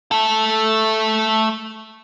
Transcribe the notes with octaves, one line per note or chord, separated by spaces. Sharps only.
A3 A4